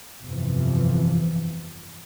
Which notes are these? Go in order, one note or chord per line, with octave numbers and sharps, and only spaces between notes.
G1 F2 C3 E3 F3